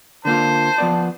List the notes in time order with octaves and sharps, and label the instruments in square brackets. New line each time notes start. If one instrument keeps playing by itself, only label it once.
[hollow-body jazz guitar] D3 A#3 F4 [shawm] C5 [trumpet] A5
[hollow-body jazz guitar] F3 B3 D5